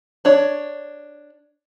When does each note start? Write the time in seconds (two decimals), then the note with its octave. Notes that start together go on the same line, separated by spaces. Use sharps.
0.25 D4 C#5